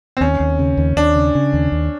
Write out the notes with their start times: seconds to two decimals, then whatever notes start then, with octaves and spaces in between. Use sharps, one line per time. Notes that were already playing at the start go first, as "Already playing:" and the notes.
0.17 C4
0.21 D#2 C#4
0.40 D#2
0.59 C#3
0.77 D#2
0.96 D#2 D4
1.16 C#3
1.35 C#3
1.53 D#2
1.72 D#2